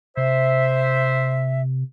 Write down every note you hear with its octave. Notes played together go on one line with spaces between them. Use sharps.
C3 C5 E5